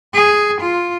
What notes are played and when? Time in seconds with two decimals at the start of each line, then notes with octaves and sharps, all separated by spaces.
0.14 G#4
0.61 F4